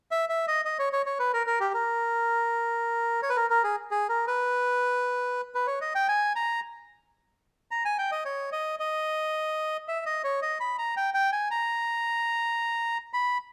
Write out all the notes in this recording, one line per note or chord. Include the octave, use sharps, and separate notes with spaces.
E5
E5
D#5
D#5
C#5
C#5
C#5
B4
A#4
A#4
G4
A#4
C#5
B4
A#4
A#4
G#4
G#4
A#4
B4
B4
C#5
D#5
G5
G#5
A#5
A#5
G#5
G5
D#5
C#5
D#5
D#5
E5
D#5
C#5
D#5
B5
A#5
G5
G5
G#5
A#5
B5